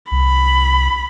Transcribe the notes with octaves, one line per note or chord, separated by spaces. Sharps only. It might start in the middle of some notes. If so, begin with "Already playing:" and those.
C2 B5